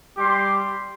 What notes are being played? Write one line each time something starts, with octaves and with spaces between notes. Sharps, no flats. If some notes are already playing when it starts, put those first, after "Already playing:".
G3 G4 C6 D6